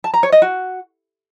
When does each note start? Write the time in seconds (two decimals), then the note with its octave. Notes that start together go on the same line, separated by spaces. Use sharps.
0.04 A5
0.14 A#5
0.23 C#5
0.32 D#5
0.42 F#4